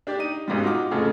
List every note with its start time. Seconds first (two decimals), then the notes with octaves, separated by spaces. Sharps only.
0.07 D4 G4 D5
0.19 D#4 D#7
0.48 G#1 G#2 B2 G3
0.63 D#4 F4 F#4 D6
0.91 F2 A2 C#3 F4 A4